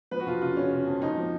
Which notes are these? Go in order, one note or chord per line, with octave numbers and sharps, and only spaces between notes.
F3 B4
F#4
F2 F4
C#3 F4
C#3 C#4
C#3
F2
F2 D#4
F3